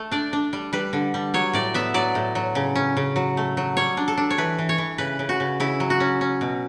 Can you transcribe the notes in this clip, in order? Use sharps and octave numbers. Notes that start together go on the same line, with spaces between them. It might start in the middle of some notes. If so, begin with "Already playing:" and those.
Already playing: A3
D4 D5
D4
G3
G3 B4
D3
G3
F#3 C#5
A2 D5
B3 E5
F#3 D5
A2
F#3
C#3
C#4
C#3
F#3
A3
F#3
G3 C#5
D4
A4
D4
C#5
E3 B4
E3
C#5
E3
C#3 B4
C#3
F#4
C#3
C#3 E4
F#3
F#4
C#4
C#4
B2